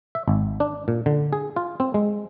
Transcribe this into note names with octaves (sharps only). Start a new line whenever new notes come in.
E5
G#1
D4
A#2
D3
G#4
F4
C4
G#3